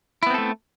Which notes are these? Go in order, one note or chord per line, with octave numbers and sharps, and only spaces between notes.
A3 B3 C4 E4 A4